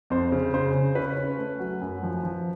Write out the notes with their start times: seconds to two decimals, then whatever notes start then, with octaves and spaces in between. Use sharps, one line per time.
0.10 F2 C5
0.32 C#3
0.54 C#3 C5
0.74 C#3
0.95 C#4 B4
1.17 C#4
1.38 A3
1.59 F#3
1.82 F#2
2.03 F3
2.23 F3